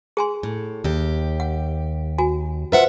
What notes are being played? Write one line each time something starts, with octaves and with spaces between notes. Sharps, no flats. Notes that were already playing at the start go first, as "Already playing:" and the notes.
G#4 G#5 C6
A2
D#2 G4
F#5
F#4 G#5
F4 B4 C5 E5 F#5